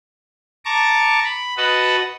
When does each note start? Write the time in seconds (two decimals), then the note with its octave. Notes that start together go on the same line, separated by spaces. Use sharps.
0.65 A5 A#5 C#6 D6
1.25 B5
1.57 F#4 B4 D#5 F#5 A5